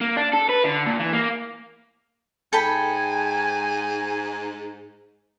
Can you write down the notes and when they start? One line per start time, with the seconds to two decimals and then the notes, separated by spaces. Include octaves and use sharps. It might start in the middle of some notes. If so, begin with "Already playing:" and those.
0.01 A#3
0.17 D4
0.33 A4
0.49 B4
0.64 D3
0.86 A#2
1.00 E3
1.13 A#3
2.53 G#2 A4 G5 G#5 B5